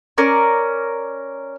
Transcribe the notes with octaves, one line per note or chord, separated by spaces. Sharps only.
C#4 A#4 D5